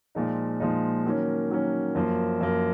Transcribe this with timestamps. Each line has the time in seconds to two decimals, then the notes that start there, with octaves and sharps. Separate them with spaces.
0.15 A#2 F3 G#3 D#4
0.60 A#2 F3 G#3 D#4
1.05 D#3 F#3 A#3 C#4
1.50 D#3 F#3 A#3 C#4
1.95 F#2 F3 A#3
2.41 F#2 F3 A#3